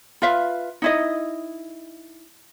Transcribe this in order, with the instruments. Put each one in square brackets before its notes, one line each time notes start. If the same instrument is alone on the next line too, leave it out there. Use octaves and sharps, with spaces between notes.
[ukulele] F4 B4 E5 F5
D#4 E4 D#5